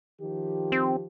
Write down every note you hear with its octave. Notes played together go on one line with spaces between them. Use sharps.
D#3 F3 G4
C4